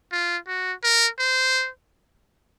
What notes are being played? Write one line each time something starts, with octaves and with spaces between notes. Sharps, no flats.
F4
F#4
A#4
C5